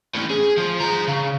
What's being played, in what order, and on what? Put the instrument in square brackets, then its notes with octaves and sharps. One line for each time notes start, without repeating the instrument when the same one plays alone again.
[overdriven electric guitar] A2 C#4
G#4
F3
G#4 A#5
C#3